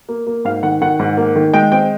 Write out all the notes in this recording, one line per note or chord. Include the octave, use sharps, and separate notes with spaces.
A#3
A#3
G#2 F5
D#3 F#5
D#3 F#5
G#2
A#3
D#3
G#3 G5
C4 G5